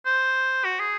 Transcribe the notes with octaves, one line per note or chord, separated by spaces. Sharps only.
C5
F#4
G#4